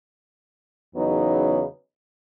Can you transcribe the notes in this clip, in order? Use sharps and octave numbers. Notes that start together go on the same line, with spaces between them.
E2 C#3 F#3 B3 D#4